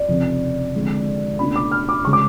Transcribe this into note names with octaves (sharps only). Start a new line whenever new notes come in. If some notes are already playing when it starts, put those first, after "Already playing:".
Already playing: D5
F1 F2 C#3
F2 D3 G#3
C#2 B2 A3 D4 B5
D6
F6
D6
C#3 G#3 C#6
D6